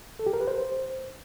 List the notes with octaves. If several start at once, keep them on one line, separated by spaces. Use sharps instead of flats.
A4
G4
A#4
B4
C5